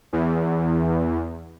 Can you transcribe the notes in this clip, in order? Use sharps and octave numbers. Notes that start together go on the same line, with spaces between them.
E2